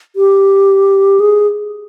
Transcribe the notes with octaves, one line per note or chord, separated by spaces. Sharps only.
G4
G#4